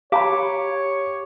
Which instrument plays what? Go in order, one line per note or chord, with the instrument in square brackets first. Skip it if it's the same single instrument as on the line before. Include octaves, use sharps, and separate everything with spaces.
[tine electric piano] G4 D6 [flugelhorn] C#5 [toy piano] F5 A#5 B5